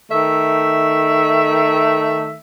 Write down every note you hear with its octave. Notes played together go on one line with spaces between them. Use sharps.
D#3 A3 E5